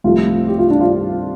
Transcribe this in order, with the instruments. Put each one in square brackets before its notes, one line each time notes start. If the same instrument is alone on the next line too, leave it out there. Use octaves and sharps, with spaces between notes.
[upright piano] C2 C3 F3 A3 F4
G4
F4
D4
F4